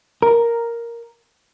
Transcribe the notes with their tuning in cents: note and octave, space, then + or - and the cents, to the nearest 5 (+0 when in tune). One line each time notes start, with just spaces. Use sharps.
A#4 +0